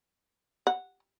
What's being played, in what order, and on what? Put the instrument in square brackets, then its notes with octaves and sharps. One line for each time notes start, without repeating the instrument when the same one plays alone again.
[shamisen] F#5